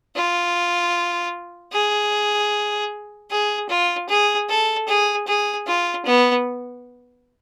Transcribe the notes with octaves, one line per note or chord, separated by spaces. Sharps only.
F4
G#4
G#4
F4
G#4
A4
G#4
G#4
F4
B3